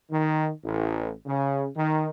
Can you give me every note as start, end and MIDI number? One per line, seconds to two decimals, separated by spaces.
0.11 0.51 51
0.64 1.12 33
1.26 1.68 49
1.76 2.09 51